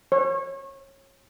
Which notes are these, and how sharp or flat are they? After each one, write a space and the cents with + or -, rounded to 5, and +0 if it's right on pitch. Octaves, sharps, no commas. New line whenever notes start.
C#5 -25